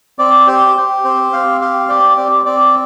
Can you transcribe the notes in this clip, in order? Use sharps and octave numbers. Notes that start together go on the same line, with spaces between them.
C4 D5
G4 C5
G4
C4 C5
C4 F5
G4 F5
G4 D5
C4 D5
C4 D5